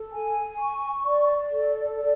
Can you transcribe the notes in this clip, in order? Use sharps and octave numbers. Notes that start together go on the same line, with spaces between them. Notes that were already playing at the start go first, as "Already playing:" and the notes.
Already playing: A4
G#5
C#6
D5
A4
D5